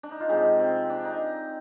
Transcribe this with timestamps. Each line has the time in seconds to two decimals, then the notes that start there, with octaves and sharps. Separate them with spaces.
0.03 D4
0.11 D#4
0.20 F4
0.29 C3 F3 G#3 G4
0.59 C4
0.90 D4
1.05 D#4